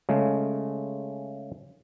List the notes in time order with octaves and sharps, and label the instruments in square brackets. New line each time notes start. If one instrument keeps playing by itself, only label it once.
[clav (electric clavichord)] C#3 G#3 A3